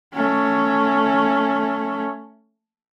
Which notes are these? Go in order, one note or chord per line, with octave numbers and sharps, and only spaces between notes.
A3 C#4